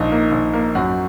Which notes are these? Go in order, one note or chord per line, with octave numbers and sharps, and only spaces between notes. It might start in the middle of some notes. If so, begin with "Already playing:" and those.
Already playing: A#1 G#2 D#4
A#3
A#1
A#3
F#2 F#4